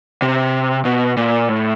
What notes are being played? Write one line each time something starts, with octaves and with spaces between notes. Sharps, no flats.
C3
B2
A#2
A2